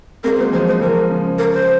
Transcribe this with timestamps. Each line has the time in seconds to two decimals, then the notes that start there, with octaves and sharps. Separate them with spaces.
0.24 G#3 C4 A#4
0.38 F#3 A#3 C5
0.52 F3 G#3 C5
0.67 C5
0.81 F3 G#3 A#4
1.10 C#3 F3
1.38 A#4
1.53 C5